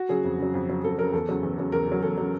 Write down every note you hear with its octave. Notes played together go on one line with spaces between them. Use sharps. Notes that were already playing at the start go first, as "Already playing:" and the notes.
Already playing: F#4
C#3 F#3 G#4
F2
C#3 F#3
F2
C#3 F#3
F2 A4
C#3 F#3 A#4
E2 A4
C#3 F#3
E2
C#3 F#3
E2 A#4
C#3 F#3
E2 A4
C#3 F#3